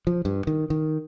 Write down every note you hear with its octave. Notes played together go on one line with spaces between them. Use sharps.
F3
G2
D#3
D#3